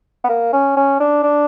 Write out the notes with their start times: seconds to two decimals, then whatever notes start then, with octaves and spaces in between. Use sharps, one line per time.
0.24 B3
0.29 A#3
0.53 C#4
0.77 C#4
1.00 D4
1.23 D4